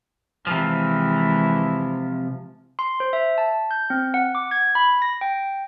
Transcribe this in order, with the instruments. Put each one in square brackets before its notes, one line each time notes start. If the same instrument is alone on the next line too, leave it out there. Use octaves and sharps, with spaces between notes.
[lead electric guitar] C3 F3 [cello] E3 G#3
[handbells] C6
C5
E5
A5
G6
C4
F#5
D6
G#6
B5
A#6
G5